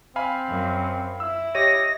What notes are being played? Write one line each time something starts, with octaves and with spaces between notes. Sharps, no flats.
C4 F5 G#5 B5
F#2
E4 E6
G4 C#5 D#5 A#6 D#7